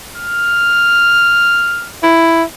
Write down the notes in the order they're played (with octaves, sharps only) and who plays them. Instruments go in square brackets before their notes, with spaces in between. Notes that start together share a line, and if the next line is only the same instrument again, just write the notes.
[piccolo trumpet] F6
[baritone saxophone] E4